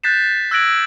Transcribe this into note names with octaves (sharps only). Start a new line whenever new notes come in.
F#6 G6 A6 B6 C7 E7
E6 F#6 G#6 A#6 D7 F#7